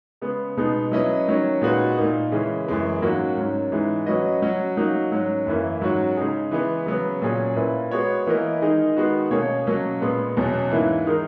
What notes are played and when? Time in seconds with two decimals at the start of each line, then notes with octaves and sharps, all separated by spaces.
0.22 C#3 G#3 B3
0.57 B2 G#3 B3 D#4
0.92 F#3 C#4 E4 B4 D#5
1.27 D#3 F#3 C#4
1.61 A#2 G#3 D#4 F#4 B4
1.97 A#2 A#3 D#4
2.32 C#3 E3 G#3 C#4
2.67 F#2 E3 G#3 B3
3.02 G#2 F#3 A#3 C#4 F#4
3.37 G#2 F#3 C#4
3.72 G#2 E3 G#3
4.06 F#3 C#4 F#4 B4 D#5
4.42 F#3 C#4 F#4
4.77 F#3 A#3 D#4 F#4
5.11 G#2 F#3 C#4
5.47 F#2 E3 A#3
5.81 G#2 F#3 C#4 F#4
6.17 C#3 G#3 D#4 G#4
6.51 E3 G#3 B3
6.86 C#3 F#3 B3
7.22 A#2 F#3 C#4 G#4
7.56 A#2 A#3 E4 B4
7.91 G#3 B3 F#4 C#5
8.27 E3 A#3 E4 A#4 D#5
8.62 D#3 G#3 D#4 G#4 D#5
8.97 D#3 G#3 B3 F#4
9.31 B2 A#3 C#4 G#4 C#5
9.67 B2 F#3 A#3 C#4
10.01 A#2 G#3 B3
10.37 E2 B2 F#3 C#4
10.71 G#2 E3 A#3 E4
11.06 D#3 G#3 D#4 A#4